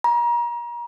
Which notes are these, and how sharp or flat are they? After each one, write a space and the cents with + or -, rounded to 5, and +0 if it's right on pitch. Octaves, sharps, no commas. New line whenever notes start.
A#5 +35